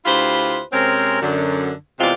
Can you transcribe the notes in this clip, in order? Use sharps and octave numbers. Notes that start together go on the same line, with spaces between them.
D2 E4 F4 G4 B4 C5
C3 G#3 C4 C#4 A#4
F#2 D3
E2 C3 G#3 C4 F4 D5